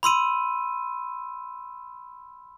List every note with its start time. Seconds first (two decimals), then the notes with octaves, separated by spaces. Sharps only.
0.03 B5 C6 E6 D#7